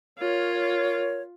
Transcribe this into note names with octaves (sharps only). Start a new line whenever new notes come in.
F4 A#4 C#5